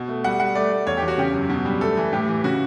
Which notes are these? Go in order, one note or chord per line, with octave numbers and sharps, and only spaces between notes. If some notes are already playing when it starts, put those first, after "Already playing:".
Already playing: B2
A3
G3 F#5
G3 F#5
A3 D5
A3
E2 C#5
G4
E2
F#4
C#3 G4
F#2
B2
G3
A3 A4
E3
A2 G4
E3
C#3 F#4